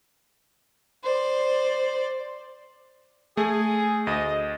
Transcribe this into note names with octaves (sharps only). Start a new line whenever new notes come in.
C5 D5
A3 G#4
D2 D#5